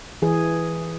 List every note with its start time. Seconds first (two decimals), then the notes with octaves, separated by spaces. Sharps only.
0.22 E3 G#4